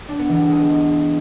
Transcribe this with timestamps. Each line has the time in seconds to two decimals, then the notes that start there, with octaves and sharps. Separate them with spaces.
0.08 D4
0.19 B3
0.29 E3
0.39 G3
0.49 G#3